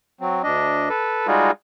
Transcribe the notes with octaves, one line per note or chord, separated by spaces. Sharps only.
F#3 C4
D2 D4 D#5
A4 B4
G3 G#3 D#4 F4 F#4 G#4